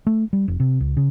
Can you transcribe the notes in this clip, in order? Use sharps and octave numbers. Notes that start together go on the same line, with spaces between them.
A3
G3
F1
C3
C#2
C#3